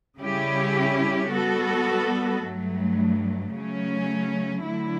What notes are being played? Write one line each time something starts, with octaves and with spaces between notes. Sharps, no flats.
C#3 G3 C#4 E4 G4
G3 B3 F#4 A4
G2 F#3 A3
C#3 F#3 A3 C#4
D3 F#3 A3 E4